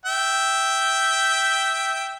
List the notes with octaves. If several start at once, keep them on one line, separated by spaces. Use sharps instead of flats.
E5 G5